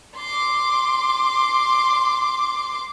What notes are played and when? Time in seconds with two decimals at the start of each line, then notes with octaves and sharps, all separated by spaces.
0.17 C6 D6